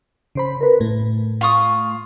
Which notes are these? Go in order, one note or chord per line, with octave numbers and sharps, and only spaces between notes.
C#3 C5 B5
A#4 B4
A2 A3
F4 C#6 D#6